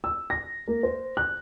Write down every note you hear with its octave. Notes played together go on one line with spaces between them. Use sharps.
E6
A#6
A#3
C5
F#6